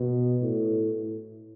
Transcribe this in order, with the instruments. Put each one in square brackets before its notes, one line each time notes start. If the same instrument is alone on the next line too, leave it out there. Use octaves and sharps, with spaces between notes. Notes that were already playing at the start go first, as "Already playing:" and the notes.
Already playing: [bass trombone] B2
A2